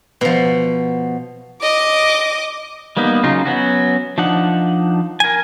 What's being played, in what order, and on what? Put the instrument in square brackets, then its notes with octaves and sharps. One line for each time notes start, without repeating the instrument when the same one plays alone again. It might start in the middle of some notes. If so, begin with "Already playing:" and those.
[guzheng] B2 F3
[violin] D#5 D6
[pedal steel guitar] G3 A#3 B3 D#4
C#3 F#3 D#4 F4
F#3 B3 C#4 F#4
F3 D4 D#4 F#5
A#4 G#5